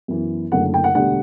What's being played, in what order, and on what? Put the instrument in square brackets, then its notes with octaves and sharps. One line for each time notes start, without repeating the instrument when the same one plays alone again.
[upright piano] F#2 E3 B3
F#1 F#2 D3 A3 F#5
G5
F#5
E1 D2 D3 G3 B3 F#5